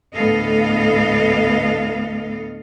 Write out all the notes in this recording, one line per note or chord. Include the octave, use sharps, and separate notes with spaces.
D2 A2 B3 A4 D#5 F5